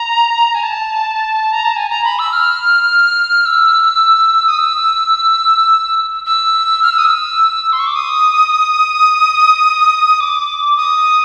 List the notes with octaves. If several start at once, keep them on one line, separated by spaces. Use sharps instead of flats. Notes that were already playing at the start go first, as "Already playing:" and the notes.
Already playing: A#5
G#5
A5
A#5
A5
G#5
A#5
B5
E6
F6
E6
D#6
E6
E6
F6
E6
D#6
E6
C6
C#6
D6
D#6
D6
D#6